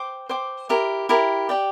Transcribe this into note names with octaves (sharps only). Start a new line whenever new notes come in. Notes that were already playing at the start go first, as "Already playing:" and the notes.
Already playing: C5 G5 D6
C5 G5 D6
E4 G4 A#4
E4 G4 A#4
G4 D5 G5